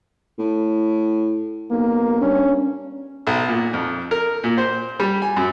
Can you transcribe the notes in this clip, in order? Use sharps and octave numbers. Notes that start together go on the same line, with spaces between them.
A2
B1 A#3
G2 C#4
B1
A#2
F2
A#4
A#2
C5
G3
G#5
F#2